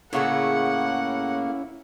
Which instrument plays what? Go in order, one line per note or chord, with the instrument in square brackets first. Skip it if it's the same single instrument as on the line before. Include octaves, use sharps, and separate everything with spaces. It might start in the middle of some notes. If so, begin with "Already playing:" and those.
[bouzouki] A2 C#3 A3 [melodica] A#3 [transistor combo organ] C#4 E4 [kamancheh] F#5